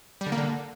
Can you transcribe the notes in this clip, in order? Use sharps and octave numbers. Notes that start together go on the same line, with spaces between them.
G3
D3
A#3
D3